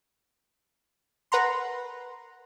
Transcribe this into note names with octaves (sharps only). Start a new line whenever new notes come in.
A#4 B4 F#5 A#5 C6